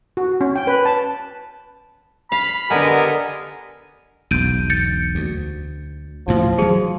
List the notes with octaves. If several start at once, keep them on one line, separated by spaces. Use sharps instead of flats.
F#4
C#4
G5
B4
A5
F5 B5
D3 B3 G4 A4 A#4 D#5 G#5
E1 B1 G6 D7 D#7
G6 A6 C#7
D2
D2 A2 F3
E3 F#3 G#4